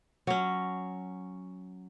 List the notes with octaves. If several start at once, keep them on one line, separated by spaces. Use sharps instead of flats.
F#3 C#4